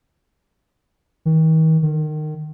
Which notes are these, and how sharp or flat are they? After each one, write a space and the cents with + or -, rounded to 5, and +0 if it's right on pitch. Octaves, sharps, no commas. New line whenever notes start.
D#3 +40
D#3 -25